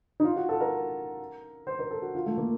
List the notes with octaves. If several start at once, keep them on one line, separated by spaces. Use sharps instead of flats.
D#4
F4
F#4
A4
A#4
C5
A#4
A4
F#4
F4
A3
A#3